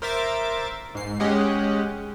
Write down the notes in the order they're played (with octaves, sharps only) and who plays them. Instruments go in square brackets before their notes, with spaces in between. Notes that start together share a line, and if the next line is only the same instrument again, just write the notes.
[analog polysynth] A#4 C5 E5 D6 A6
G#2 C7
G#3 C#4 G4 D#5 F#5